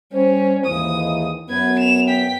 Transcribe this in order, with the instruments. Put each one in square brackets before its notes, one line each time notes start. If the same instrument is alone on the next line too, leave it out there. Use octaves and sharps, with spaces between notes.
[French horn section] G3 C5 [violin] C#4
[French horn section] D#2 G#2 E3 [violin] D#6
[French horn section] F#2 B3 [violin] B4 G#6
[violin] E7 F7
G5 B6